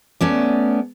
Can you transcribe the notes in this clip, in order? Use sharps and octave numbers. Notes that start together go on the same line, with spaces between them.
A3 B3 C#4 D5